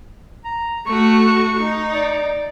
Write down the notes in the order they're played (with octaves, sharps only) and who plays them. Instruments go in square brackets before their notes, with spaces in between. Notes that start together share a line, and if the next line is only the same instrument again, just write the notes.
[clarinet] A#5
[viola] A3 F#4 [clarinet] C#6
[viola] D#4
[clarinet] D5